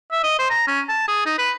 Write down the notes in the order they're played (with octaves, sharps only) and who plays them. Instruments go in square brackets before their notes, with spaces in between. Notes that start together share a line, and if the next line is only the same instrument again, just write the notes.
[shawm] E5
D#5
C5
A#5
C#4
A5
G#4
D#4
B4